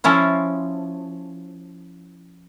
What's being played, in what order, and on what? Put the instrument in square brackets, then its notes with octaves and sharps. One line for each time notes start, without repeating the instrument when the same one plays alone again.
[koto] F3 C#4 E4 F4